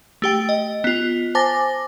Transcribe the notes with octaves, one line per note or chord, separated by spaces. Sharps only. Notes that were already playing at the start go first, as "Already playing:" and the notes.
A3 G4 G5
D#5
B3 F4
C5 G#5 A5 D6 A6 A#6